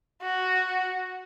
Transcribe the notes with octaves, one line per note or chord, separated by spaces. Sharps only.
F#4